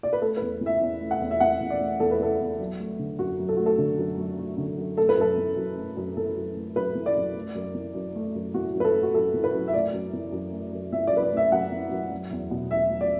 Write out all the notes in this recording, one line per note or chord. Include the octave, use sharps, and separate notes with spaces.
D5
B4
A3 A4
B4
E2
E3
E5
E2
A3
F#5
E2
E5
E3 F#5
E2
D5
A3
E2 A4
B4
E3 A4
E2
F#3
A3
D3
F#2 F#4
F#3
A4
A3 F#4
A4
D3
F#2
F#3
A3
D3
F#2
A3 A4
B4
F#2 A4
E3
F#2
A3
F#2
E3 A4
F#2
A3
F#2 B4
E3
D5
F#2
A3
F#2
E3
F#2
A3
F#2
E3 F#4
F#2
B4
A4
A3
F#4
F#2 A4
E3
B4
F#2
E5
A3 D5
F#2
E3
F#2
A3
F#2
E3 E5
D5
F#2 B4
D5
A3 E5
F#2 F#5
E3
F#2
F#3
E2
B2
E2 E5
F#3
D5